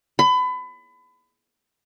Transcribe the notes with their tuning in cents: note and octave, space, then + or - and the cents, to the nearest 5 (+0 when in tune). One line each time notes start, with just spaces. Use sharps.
B5 +30